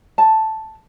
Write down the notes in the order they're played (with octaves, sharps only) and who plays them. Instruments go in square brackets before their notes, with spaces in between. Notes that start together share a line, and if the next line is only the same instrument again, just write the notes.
[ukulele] A5